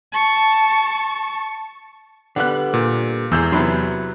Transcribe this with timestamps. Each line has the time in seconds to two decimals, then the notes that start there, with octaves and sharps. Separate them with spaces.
0.12 A5 C#6
2.36 D3 G3 B3 F#5 F#6
2.74 A#2
3.31 E2 E3 G#3 E6 G6
3.52 C3 F#3 B3 E4 C6